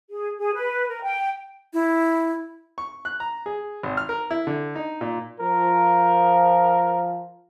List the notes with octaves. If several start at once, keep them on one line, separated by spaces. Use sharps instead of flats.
G#4
G#4
B4
A#4
G5
E4
C#6
F#6
A#5
G#4
G#1
F6
A#4
E4
D3
D#4
A#2
F3 A#4